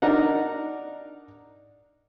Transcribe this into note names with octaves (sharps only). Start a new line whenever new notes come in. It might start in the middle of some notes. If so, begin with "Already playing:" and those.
D4 D#4 A#4 F#5